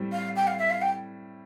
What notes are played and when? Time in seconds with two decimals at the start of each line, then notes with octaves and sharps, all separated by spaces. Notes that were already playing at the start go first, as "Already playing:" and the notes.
Already playing: A2 G3 C4
0.12 F5
0.36 G5
0.47 F5
0.59 E5
0.70 F5
0.82 G5